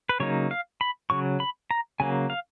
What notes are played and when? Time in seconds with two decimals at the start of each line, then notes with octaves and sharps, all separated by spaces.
0.09 B4
0.20 C#3 F#3 A#3 D#4 C#5
0.51 F5
0.81 B5
1.10 C#3 F#3 C#6
1.40 B5
1.71 A#5
2.00 C#3 F#3 A#3 G#5
2.30 F5